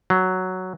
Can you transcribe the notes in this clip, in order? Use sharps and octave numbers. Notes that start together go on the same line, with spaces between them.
F#3